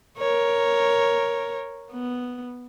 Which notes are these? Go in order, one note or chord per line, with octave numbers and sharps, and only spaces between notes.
A#4 C#5
B3